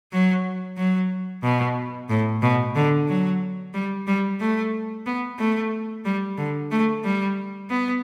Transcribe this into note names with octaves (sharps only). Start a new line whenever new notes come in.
F#3
F#3
B2
A2
B2
D3
F#3
G3
G3
A3
B3
A3
G3
D3
A3
G3
B3